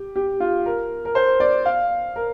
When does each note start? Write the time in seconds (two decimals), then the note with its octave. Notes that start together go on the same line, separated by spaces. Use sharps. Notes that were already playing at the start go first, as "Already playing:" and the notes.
Already playing: G4
0.16 G4
0.40 F4
0.66 A#4
1.05 A#4
1.15 C5
1.40 D5
1.65 F5
2.16 A#4